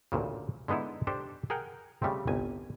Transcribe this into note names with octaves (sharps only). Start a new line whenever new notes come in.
A1 D2 A#2 C#3
D3 G#3 B3 D#4 E4
D4 G4 A4 C5
G#4 A#4 F#5 G5
C#3 G3 A3 C4
G1 C2 G#5